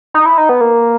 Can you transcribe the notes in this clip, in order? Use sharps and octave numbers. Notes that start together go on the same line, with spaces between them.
D#4
E4
D#4
B3
A#3